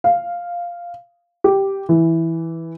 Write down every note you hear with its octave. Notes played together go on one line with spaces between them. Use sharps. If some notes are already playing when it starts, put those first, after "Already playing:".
F5
G4
E3